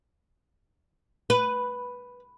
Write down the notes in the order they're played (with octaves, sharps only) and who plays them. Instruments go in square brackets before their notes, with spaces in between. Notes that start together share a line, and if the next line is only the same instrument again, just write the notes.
[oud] B4